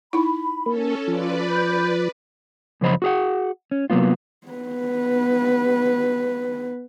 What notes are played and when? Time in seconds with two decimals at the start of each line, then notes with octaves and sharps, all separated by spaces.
0.13 D#4 E4 B5
0.66 A#3 C#4 A4
1.08 F3 F4 F#4 B4 D5
1.49 B5 G6
2.81 F#2 C#3 F3 C5 D#5 B5
3.02 F#4 G#4 F#5
3.71 C#4
3.90 C3 F#3 A#3 B3 F4
4.47 B3 B4